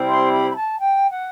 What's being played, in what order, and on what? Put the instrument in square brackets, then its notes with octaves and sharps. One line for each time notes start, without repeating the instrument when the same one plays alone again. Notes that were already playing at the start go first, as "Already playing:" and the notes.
Already playing: [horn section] C3 G3 C4 E4 G4
[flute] C6
B5
B5
A5
G5
F#5